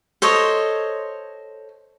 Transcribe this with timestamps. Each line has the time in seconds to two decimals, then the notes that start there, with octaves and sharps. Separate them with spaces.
0.22 A4 C5 C#5 D#5